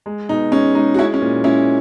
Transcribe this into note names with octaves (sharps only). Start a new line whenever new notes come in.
G#3
B2 D#4
G#3 C#4
G#3 D#4
F#4
G#3 C#4 E4
C#4
A#2
G#3 C#4 E4